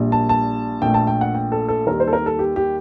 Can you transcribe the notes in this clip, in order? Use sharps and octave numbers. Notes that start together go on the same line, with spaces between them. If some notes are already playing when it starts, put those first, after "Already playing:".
Already playing: A#1 A#2 G3
A5
A5
A#1 A#2 A3 G5
A5
G5
F#5
G5
A4
A4
D#2 D#3 G3 A#4
C5
A4
A#4
A4
G4
G4